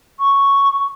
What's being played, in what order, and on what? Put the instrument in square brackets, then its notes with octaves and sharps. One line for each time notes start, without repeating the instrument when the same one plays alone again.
[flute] C#6